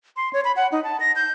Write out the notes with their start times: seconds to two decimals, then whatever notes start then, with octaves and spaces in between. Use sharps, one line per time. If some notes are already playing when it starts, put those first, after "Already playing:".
0.16 C6
0.33 C#5
0.44 B5
0.56 F#5
0.72 D#4
0.84 A5
1.00 A#6
1.16 G6